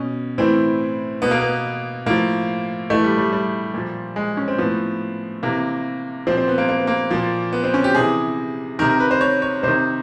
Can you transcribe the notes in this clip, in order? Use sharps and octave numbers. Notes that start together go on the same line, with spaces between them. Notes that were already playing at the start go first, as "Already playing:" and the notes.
Already playing: B2 C#4
A2 E3 C4
B2 B3
A#3
B3
A2 F3 A#3
A2 E3 A3
G3
G3
G3
A#2 F3
G#3
C#4
C4
A2 F3 B3
C3 E3 A#3
A#2 F3 C4
C4
B3
A#3
A#3
B3
A#3
A#2 F3
B3
C4
C#4
G4
C3 E3 G#4
C3 D#3 A#4
A#4
B4
C5
C#5
C#5
C3 D#3 C5